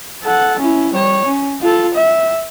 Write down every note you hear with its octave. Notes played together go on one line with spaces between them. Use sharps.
A4 F#5
C#4 E4
G3 C#5
C#4
F4 A4
E5